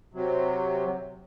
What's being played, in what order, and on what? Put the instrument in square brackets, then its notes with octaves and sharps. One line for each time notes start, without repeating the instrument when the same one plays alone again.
[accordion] C3 F#3